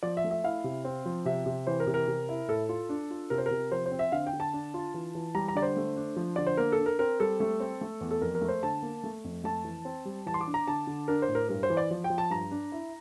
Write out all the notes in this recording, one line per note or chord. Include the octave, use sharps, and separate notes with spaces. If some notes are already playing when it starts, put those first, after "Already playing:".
F3 D5
E5
A3
E5
E4 F5
C3
C4
F3
C3 E5
C3
E3 C5
A#4
C3
A#4
C3
E4
A2 A4
F4
D4
F4
C3 A#4
C5
A#4
C3
F3 C5
C5
C4
E5
D3 F5
G5
D3
A5
D4
F4
E3
E3
G3 A#5
A#5
D3 D5
C5
A3
D4
F3
D3 D5
C5
A#3 A#4
A4
D4
A#4
C4 A#4
G3 A4
A3
C4
A3
E2
A4
F2 A#4
A#4
A3
C5
D3 A5
A#3
A3
F2
A3 A5
E3
C4
G3
E3 A5
C6
D6
D4
A#5
D3 A5
D3
D4 A#4
C5
A2
A#4
G2 A#4
C5
E3
D5
F3
G5
F3
A5
G2 A#5
D4
E4